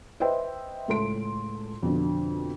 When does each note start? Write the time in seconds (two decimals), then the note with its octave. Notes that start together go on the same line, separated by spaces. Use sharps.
0.20 B4 C5 D#5 E5 G5
0.88 C#2 A2 A4 C6 D7
1.82 F2 B2 D3